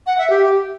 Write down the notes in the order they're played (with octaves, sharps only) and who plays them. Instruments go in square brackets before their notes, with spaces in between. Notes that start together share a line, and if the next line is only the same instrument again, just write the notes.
[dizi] F#5
E5
G4